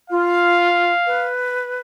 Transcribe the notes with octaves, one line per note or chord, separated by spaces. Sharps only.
F4 F5
B4